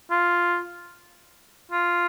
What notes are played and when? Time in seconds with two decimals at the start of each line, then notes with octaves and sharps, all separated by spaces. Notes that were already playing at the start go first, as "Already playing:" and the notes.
0.11 F4
1.72 F4